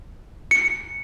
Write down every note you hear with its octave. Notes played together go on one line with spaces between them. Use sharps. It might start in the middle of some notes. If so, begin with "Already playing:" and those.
C#7